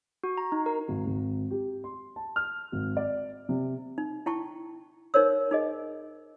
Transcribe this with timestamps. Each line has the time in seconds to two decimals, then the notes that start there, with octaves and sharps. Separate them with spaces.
0.24 F#4
0.37 A#5
0.52 D#4
0.66 A#4
0.88 G#1
1.06 G#1
1.51 G4
1.84 C6
2.16 A5
2.36 F6
2.72 G#1
2.97 D5
3.49 C3
3.98 D#4
4.26 E4 G5 A5 C#6
5.14 D#4 A#4 C5 C#5 E6
5.51 D#4 G#4 D#5